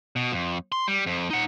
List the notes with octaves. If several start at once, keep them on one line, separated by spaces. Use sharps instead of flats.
B2
F2
C6
G3
F2
D#4 F#5